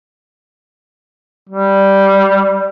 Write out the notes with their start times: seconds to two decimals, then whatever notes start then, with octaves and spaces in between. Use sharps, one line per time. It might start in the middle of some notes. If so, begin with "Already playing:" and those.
1.49 G3